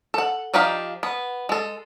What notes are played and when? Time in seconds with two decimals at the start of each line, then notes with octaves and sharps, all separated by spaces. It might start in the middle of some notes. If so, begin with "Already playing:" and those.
0.14 A4 F#5
0.54 F3 D4 D#4 G4 F5
1.03 B3
1.49 G#3 A4